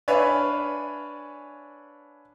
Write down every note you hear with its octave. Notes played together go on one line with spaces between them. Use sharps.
D4 B4 C#5 E5 F5 G#5